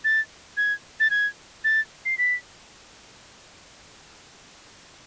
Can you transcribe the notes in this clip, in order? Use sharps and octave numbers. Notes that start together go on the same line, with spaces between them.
A6
G#6
A6
G#6
A6
C7
B6